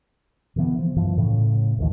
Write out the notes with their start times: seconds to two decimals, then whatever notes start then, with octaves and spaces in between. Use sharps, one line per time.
0.56 B2 D3 E3 B3
0.79 F3
0.96 G2 E3 F3
1.18 A2 C#3
1.79 A1 D#2 D#3 F3